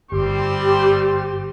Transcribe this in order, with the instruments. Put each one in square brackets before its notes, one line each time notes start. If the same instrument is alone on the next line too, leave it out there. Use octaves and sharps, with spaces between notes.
[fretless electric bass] G1 [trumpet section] G3 C4 C6 [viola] G4